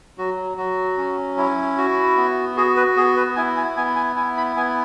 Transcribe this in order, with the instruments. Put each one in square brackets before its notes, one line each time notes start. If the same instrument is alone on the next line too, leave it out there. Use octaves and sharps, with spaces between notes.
[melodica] F#3 F#4
F#3 F#4
C#4
E4
F#4
B3
F#4 G#4
B4
B3 G#4
B4
E4 G#5
G#5
B3 G#5
G#5
E4 G#5
B5
B3 G#5